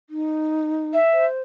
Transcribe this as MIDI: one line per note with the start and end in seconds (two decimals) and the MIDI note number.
0.10 0.94 63
0.94 1.26 76
1.12 1.42 72